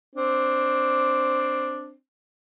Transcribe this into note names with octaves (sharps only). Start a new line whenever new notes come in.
C4 D4